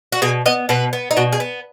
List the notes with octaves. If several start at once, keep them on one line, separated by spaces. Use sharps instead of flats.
F#4
B2 G#4
B3 D#5
B2 B4
B3
D#4
B2 F#4
G#4
B3